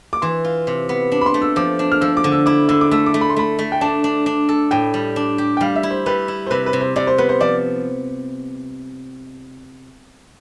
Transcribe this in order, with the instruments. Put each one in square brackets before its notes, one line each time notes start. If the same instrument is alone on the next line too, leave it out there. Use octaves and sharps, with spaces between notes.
[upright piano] D6
[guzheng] E3 [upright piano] C6
[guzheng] F4
C3
B3
D4
[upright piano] B5
C6
[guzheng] A3
[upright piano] E6
[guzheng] F3 [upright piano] D6
[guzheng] D4
[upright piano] F6
[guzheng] F3 [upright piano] E6
[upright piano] D6
[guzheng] D3
[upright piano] E6
[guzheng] E4 [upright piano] D6
[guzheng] D3 [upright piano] E6
[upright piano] D6
[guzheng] A3 [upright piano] E6
[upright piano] D6
[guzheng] A3
[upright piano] B5
C6
[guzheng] A3 [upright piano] B5
[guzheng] A3
[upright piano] G5
[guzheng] D4 [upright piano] A5
[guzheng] D4
D4
A4
[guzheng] A2 [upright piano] G5
[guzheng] G3
D4
G4
[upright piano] G5
[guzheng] G3 [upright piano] F5
[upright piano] E5
[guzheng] E4
[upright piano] C5
[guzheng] G3 [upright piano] B4
[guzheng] E4
[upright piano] C5
[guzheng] C3 [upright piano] B4
[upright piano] B4
[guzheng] C3
[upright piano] C5
[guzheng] C3 [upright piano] D5
[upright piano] C5
[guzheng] B3 [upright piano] B4
[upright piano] C5
[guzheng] F3 [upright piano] D5